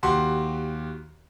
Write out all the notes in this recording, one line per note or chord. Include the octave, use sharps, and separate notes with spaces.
D#2 F#4 G4 C6